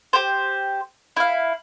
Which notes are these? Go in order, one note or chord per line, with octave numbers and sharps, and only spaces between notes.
G4 C5
E4 F5